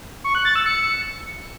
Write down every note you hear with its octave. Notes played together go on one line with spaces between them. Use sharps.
C#6
F#6
A6
E6
C#7